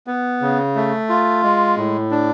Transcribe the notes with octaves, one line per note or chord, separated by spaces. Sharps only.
B3
C#3
A3
F4
G#3
A2
D4